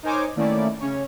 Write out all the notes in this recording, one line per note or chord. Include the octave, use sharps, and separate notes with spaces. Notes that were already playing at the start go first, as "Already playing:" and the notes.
D#4 A#4 C5 C#5 G#5 D6
D#3 A3 A#3 C#4 E4 D5
C#3 C#4 C#5